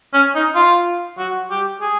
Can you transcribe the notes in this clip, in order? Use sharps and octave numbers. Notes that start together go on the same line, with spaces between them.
C#4
D#4
F4
F#4
G4
G#4